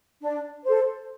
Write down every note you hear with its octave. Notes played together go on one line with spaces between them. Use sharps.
D4
A4 C5